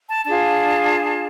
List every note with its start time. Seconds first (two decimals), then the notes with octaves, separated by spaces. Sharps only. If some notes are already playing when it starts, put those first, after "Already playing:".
0.09 A5
0.25 D4 F4 G#4 A5